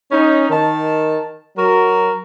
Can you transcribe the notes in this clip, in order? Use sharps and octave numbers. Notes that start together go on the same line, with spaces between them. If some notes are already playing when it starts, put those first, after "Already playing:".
C#4 D#4
D#3 A5
F#3 F#4 A#4